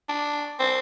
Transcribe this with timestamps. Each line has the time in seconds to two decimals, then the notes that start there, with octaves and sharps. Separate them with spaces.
0.09 D4
0.59 C4